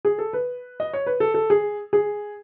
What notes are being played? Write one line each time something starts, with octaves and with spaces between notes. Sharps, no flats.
G#4
A4
B4
D#5
C#5
B4
A4
A4
G#4
G#4